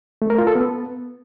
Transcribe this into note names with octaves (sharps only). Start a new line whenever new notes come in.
A3
A#4
F4
A4
B3